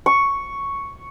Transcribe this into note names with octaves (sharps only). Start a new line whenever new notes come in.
C#6